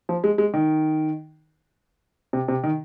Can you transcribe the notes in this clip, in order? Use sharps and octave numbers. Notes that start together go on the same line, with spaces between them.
F3
G#3
G#3
D#3
C3
C3
D#3